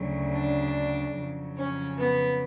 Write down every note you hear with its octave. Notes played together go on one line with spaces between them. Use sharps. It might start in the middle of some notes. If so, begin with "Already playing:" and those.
Already playing: D2 C#3 F#3
D4
F2 C#3 F#3
C#4
B3